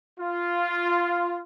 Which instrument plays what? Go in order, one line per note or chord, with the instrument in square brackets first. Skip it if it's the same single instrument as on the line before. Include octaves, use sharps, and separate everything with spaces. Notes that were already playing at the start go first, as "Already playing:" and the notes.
[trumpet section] F4